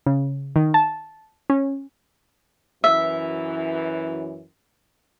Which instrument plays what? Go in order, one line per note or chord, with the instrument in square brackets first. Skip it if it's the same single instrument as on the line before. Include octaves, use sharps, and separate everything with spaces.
[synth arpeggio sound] C#3
D#3
A5
C#4
[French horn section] F#2 E3 [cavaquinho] E5